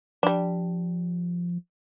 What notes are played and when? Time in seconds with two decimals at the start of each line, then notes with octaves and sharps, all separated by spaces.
0.23 F3 G3 D4